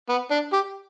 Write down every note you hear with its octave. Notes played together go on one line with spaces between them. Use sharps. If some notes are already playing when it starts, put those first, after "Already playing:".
B3
D4
G4